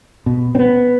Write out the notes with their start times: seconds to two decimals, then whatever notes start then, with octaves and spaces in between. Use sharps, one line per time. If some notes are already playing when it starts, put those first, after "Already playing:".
0.26 B2
0.55 C4
0.59 B3